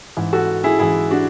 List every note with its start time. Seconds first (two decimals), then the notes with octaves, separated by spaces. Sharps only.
0.17 G#2 E3
0.33 F#4 A4
0.64 E4 G#4
0.79 G#2 E3 E4 G#4
1.11 D4 F#4